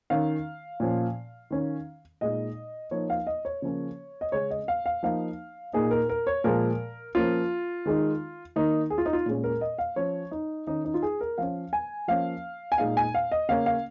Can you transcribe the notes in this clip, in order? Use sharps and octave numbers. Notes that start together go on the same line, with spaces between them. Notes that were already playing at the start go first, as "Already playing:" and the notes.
D#3 C#4 F5
A#2 F3 C#4
D#3 C#4
A#2 G#3 D#4 D#5
F3 A#3 D#4 C#5
F5
D#5
C#5
C#3 F3 A#3 C#4
D#5
C#3 G#3 C#4 C#5
D#5
F5
F5
F3 A#3 D#4 F5
A#2 A#3 D#4 G#4
A#4
A#4
C#5
A#2 F3 G#3 A#4
F3 A#3 C#4 F4
D#3 G#3 D#4
D#3 A#3 D#4
G#4
F4
D#4
F4
A#2 G#3 C#4
A#4
D#5
F5
F3 C#4 C#5
D#4
D#3 C#4 D#4
D#4
F4
G#4
A#4
F3 C#4 F5
G#5
F3 A#3 C#4 F5
G#5
A#2 G#3 D#4 F5
G#5
F5
D#5
C#3 A#3 C#4 F5
F5